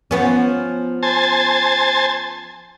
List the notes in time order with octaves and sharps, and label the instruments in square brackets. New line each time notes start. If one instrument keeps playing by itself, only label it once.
[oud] F3 B3 C#4
[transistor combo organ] C5 G#5 A5